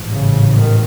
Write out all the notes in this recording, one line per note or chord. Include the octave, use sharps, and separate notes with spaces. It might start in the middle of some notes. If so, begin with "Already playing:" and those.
Already playing: A1 G#2
C#3
D#3